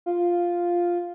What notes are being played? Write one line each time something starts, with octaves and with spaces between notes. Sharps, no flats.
F4